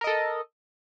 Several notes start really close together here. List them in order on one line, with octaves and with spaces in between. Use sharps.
A#4 D#5 A4